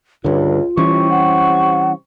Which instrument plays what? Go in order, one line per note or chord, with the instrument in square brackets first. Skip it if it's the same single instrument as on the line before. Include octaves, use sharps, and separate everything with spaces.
[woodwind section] C#2 [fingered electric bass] G2 D3 [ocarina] F4
[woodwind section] C3 C4 C#6 [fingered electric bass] E3 G3 C#4
[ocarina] F#5